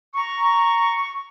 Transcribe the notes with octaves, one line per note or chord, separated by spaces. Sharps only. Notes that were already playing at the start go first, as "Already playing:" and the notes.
A#5 C#6